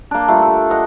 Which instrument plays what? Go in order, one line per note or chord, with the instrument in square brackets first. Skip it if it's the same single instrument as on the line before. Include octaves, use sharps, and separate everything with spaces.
[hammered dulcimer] A#3 D4
G3 A3 F4
A4
A#4 D#5 F#5